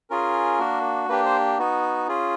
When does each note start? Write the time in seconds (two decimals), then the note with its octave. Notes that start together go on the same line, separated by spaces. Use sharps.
0.10 C#4 F4 G#4 A#4
0.59 A#3 D4 F#4
1.09 A#3 D4 G4 B4
1.25 C5
1.58 B3 D#4 F#4
2.08 C#4 F4 G#4